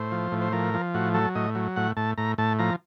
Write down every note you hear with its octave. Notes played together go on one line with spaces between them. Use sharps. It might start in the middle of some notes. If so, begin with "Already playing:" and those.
Already playing: A2 C5
F3
A2
C5
F3 A#4
F3
A2 F#4
F#3 A4
A2 D#5
F#3
A2 F#5
A2 A5
A2 A#5
A2 A5
F3 A#5